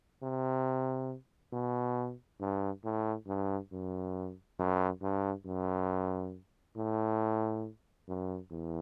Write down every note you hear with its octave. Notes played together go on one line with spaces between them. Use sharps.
C3
B2
G2
A2
G2
F#2
F#2
G2
F#2
A2
F#2
E2